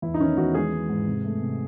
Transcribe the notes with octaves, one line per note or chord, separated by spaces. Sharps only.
E2 E4
D#4
D#3 C#4
E2 F#4
G#3 G#4
G#3
G#2
C3
A3
C3